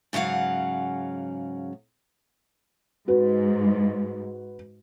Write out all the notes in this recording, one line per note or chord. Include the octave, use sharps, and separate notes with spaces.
G#2 C#3 F#3 F5 F#5
G#2 F#4 B4